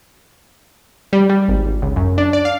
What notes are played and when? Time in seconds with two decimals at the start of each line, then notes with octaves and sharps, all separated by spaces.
1.13 G3
1.29 G3
1.48 G#1
1.65 G#1
1.82 C#2
1.96 F#2
2.18 D4
2.33 D5
2.45 F5